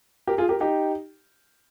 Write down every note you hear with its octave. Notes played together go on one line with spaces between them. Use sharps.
G4 A#4
F4 G#4
G4 A#4
D#4 G4